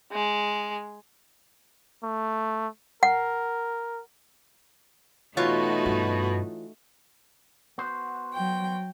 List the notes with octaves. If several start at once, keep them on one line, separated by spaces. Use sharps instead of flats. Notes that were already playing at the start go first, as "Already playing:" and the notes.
G#3
A3
A#4 F#5
B2 E3 A3 D#4 F4 F#4 C#5
G2
B3 F#4 C5
F#3 G5